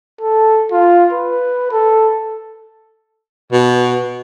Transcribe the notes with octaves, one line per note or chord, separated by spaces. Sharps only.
A4
F4
B4
A4
B2